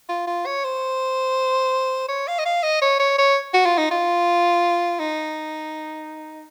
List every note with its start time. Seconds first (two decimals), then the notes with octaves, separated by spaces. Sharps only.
0.09 F4
0.27 F4
0.46 C#5
0.64 C5
2.09 C#5
2.28 F5
2.39 D#5
2.46 F5
2.63 D#5
2.82 C#5
2.99 C#5
3.18 C#5
3.54 F#4
3.66 F4
3.78 D#4
3.91 F4
4.99 D#4